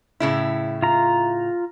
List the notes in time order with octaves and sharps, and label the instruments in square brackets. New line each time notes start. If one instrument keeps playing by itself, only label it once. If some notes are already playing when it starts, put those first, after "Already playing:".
[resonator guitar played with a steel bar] A2 C#3 E4
[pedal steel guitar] F4 A#5